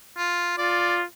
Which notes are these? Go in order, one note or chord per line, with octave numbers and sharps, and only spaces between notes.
F4
F4 D5